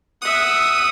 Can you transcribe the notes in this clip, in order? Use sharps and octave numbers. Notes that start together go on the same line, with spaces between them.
E5 F#5 D#6